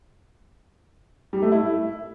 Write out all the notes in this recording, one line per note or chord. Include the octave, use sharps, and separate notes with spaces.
G3
A3
E4